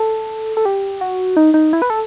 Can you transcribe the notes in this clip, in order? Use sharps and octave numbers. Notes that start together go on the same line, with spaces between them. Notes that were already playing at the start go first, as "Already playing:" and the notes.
Already playing: A4
A4
G4
F#4
D#4
D#4
E4
B4
A4